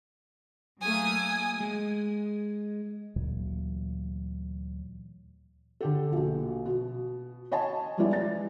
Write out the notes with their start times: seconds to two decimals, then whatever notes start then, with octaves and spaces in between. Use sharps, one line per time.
0.81 F#3 A3 A#3 G#5 D#6
1.61 G#3
3.16 D2 A#2 E3 F#3
5.81 D3 G4 A4
6.12 A#1 B2
6.66 B2
7.52 C#5 D#5 G#5 A5
7.97 F3 G3 G#3 B3 E4 D5
8.13 A6